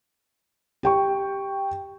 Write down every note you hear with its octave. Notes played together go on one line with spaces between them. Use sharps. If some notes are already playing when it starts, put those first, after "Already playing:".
G4 G5 C#6